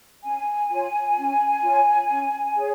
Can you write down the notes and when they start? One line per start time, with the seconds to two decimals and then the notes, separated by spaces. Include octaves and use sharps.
0.24 C#4 G#5
0.69 F4 C#5
1.16 C#4
1.62 F4 C#5
2.08 C#4
2.54 G#4 C#5